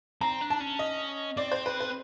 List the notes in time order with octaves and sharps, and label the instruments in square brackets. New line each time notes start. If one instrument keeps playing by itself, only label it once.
[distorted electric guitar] C4 [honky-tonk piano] A#5
[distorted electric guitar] D4
[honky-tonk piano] A5
[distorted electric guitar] C#4
[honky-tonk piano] D#5
[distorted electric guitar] C4 [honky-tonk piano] D5
[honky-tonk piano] C5
B4
B4